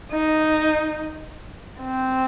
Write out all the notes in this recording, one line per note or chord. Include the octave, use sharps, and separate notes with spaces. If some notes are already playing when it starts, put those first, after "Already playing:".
D#4
C4